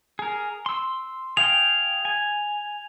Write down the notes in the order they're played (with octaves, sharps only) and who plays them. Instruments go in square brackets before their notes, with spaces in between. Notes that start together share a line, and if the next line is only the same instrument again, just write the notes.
[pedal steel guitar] G#4 A#4
C6 E6
[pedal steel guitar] G#4 F5 G5 [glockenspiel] F7
[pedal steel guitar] G#5